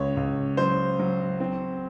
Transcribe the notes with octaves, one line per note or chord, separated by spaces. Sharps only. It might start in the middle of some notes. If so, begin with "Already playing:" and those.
Already playing: C#2 C#5
C#2
F#3 C5
F#3
C4